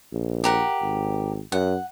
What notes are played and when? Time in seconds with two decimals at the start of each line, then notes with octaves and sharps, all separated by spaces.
0.12 A#1
0.44 G4 A#4 F#5
0.81 G#1
1.52 F#2 F#5